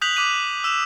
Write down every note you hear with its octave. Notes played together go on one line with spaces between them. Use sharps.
D#6 F#6 G6 B6 F7 F#7
D6 F#6 B6 D#7
E6 E7 F7